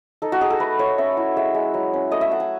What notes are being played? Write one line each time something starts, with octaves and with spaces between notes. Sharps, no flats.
D#4 A4
F#4
D#4 G#4
A4
A3 B4
A3 C#5
C#4 E5
E4
G#3 E5
G#3
F#3
C#4
A3 D#5
E5
A3 F#5
G#5